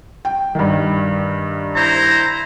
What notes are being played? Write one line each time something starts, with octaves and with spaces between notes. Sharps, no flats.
G5
G2 D#3
E4 C5 A#5